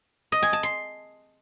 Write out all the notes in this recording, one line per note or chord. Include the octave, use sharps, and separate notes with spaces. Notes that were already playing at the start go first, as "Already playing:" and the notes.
D#5
G#5
A5
C6